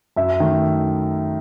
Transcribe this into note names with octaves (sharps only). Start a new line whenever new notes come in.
F#2 E5
D#3 A3